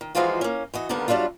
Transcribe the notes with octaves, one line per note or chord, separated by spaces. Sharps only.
D#3
E3 F3 G#3 D#4 F4 F#4
A#3 C#4
E3 F#4 D#5
D3 D#3 G3 A#3 B3
F#3 G3 D4 E4 F4